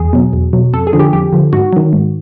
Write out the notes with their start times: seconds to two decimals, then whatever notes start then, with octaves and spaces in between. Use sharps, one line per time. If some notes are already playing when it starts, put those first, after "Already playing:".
Already playing: E2 G#4
0.13 B2 F#3
0.33 E2
0.53 B2 F#3
0.73 F2 A4
0.87 G#4
0.93 D3 F3
0.99 G4
1.13 F2 G4
1.33 D3 F3
1.53 G#2 F#4
1.73 D#3 F#3
1.93 G#2